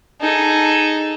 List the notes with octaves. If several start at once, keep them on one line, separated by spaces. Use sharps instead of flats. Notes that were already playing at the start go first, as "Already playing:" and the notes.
D#4 G#4 A4